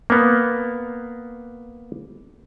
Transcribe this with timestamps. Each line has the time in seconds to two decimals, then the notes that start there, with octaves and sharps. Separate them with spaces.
0.10 A#3 B3